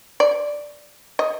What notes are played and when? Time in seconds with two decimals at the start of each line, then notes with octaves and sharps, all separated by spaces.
0.20 D5
1.19 D#5